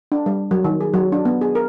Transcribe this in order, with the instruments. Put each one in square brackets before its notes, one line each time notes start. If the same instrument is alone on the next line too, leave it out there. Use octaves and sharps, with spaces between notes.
[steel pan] D4
G3
F#3
D#3
G#4
F#3
D4
B3
G#4
A#4